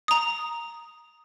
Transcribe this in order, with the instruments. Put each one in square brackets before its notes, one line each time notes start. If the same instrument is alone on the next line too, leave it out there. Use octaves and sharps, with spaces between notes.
[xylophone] A#5 D#6